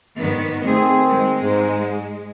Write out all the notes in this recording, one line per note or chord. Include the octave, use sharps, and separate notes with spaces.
G#2 D#3 B3
D#3 A3 C4 G#4
G#3
G#2